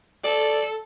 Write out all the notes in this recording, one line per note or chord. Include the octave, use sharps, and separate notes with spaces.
A4 D5